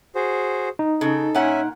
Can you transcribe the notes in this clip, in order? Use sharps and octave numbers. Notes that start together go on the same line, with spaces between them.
F#4 G#4 C5
D#4
C#3 A4
A#2 C#4 E5 F#5 G#5